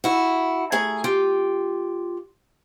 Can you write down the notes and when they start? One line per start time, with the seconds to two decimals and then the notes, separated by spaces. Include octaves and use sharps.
0.04 E4 F#4
0.72 A3 G#4 G#5 A#5
1.04 F4 G4